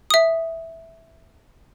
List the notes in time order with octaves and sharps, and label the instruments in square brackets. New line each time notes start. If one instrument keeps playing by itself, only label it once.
[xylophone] E5 D#6